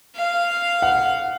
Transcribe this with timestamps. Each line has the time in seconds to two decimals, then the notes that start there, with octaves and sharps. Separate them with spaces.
0.16 F5
0.82 F#5